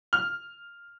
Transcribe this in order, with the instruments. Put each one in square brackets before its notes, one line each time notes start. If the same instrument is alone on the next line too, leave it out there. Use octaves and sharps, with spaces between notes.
[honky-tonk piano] F6